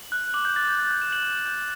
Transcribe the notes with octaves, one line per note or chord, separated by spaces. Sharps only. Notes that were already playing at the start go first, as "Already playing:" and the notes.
Already playing: F#7
F#6
D6 F#7
G6
F#6 A6
G6
D6 A6
G6
G6 E7
F#7
D6
G6